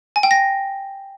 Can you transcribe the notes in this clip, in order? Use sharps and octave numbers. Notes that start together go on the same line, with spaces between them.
G#5
G5
A#6